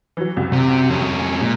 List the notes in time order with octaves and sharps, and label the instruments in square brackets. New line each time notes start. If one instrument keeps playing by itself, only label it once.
[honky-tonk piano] E3 F#3
C2 F#2
[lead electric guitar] C3
F2 C#4
[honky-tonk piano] G#5
[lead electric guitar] A#2 [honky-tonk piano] G#3